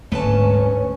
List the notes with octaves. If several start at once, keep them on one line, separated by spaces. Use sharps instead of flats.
D1 D2 G#2 A3 C#4 B4 A5